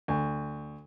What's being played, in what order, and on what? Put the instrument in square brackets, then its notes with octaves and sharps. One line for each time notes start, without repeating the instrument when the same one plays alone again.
[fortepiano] D2